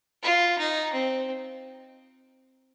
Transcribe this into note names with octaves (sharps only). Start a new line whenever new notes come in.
F4
D#4
C4